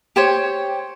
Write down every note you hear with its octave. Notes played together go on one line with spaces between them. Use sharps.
G4 C5 C#5